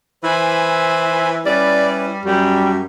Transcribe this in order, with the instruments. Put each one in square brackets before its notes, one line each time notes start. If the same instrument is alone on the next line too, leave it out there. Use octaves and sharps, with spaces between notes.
[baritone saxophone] E3 [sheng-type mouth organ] C5 G#5 B5
[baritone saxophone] G3 [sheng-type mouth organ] C#4 E4 B4 [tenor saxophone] D5
[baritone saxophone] F#2 [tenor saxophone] G3 [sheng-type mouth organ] F#4 G4